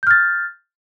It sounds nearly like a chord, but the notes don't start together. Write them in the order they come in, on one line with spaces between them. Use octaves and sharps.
G6 F6 A6